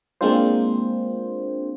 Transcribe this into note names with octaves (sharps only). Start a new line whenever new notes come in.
G#3 A#3 C4 D4 F4 C5